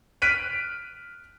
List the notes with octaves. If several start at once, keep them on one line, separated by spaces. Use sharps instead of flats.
F6 F#6 B6 D7 D#7